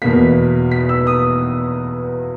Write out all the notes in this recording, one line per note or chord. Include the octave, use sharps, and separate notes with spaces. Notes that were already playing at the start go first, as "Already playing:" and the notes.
E2 B2 A#3 B6
B6
E6
D#6